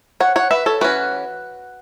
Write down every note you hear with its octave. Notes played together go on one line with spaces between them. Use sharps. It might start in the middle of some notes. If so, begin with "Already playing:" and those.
C#5 F#5
C#5 F#5
B4 E5
A4 C#5
E3 C#4 F#4 B4